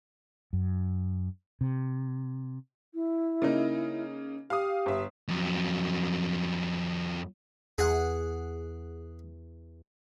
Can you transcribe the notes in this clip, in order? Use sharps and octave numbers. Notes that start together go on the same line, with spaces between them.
F#2
C3
E4
C#3 A#3 D#4
G4 F5 D#6
G1 E5
F2 F#3
E2 G#4 F#5